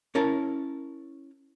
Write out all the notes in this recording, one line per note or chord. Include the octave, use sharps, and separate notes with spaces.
C#4 E4 A#4 C#5 A5